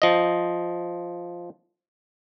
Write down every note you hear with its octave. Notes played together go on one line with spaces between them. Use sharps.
F3 D#5